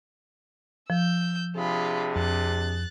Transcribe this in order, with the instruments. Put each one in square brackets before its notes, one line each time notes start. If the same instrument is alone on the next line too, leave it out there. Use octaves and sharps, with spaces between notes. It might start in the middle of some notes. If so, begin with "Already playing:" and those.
[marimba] F3 [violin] E6 G6
[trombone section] C3 D4 G#4 [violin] F4 B5
[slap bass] F2 [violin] F#6 A6